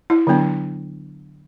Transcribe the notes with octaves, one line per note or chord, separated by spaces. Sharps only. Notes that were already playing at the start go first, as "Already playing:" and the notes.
E4
D3 F#3 B3 D4